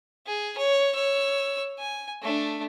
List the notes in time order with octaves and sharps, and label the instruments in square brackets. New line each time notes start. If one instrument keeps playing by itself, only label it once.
[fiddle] G#4
C#5
C#5 E6
G#5
A3 D4